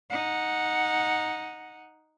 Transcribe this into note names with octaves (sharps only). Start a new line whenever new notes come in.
D#4 F#5